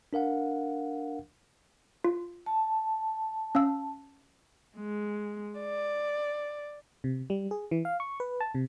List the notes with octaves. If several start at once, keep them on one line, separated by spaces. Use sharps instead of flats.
D4 A#4 F5 F#5
F4
A5
C#4 F5 E6
G#3
D5
C3
G3
G#4
E3
F5
C#6
B4
A5
C3